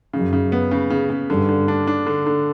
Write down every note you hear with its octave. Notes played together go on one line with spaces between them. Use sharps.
F#2 C#3
C#3
B3
C#3
C#3
C#3
G2 D3
D3
D4
D4
D3
D3